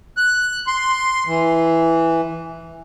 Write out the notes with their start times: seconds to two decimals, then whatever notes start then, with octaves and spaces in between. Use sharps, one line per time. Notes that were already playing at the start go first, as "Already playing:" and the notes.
0.17 F#6
0.67 C6
1.27 E3